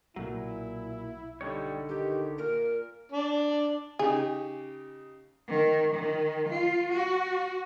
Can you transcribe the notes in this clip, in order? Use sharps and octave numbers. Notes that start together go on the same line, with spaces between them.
B1 A#2 F#3 E4
D3 G3 D#4 C#5
D#3 G4
A#2 A#4
D4
C#3 D#4 G4 G#4
D#3
D#3
F4
F#4